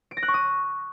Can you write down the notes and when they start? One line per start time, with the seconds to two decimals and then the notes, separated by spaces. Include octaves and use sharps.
0.11 D7
0.17 A#6
0.23 F#6
0.28 C#6
0.34 D#6